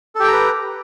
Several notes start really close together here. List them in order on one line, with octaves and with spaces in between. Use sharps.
A4 G4 G5 A#5 B4